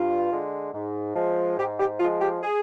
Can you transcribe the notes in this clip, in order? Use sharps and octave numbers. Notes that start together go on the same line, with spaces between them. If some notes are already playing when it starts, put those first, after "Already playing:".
Already playing: G2 F4
D3 G#3
G#2
F3 G#3
G#2 G4
G4
F3 G#3 F4
G4
G#4